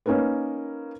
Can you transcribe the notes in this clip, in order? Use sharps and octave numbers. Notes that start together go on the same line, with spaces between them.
A#3 C#4 D#4 A#4 B4